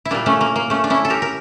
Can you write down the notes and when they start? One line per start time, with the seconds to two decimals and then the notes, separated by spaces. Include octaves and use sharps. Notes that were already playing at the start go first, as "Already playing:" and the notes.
0.05 E4
0.11 A#2 G3 A#3 D4
0.26 A3 C#4
0.41 A#3
0.56 A#3
0.70 A3 C#4
0.84 D4
0.90 C#4 E4
1.05 A4
1.10 G4 A#4
1.22 A#4